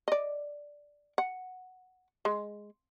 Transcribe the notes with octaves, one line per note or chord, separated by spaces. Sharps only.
D5 D#5
F#5
G#3